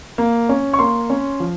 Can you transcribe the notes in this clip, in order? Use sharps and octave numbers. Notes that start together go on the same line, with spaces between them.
A#3
C#4
C#6
A#3 C6
C#4
F3